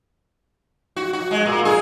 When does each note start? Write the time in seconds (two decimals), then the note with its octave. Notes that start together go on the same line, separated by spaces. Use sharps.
0.96 F#4
1.13 F#4
1.31 G#3
1.46 A#2
1.65 G#4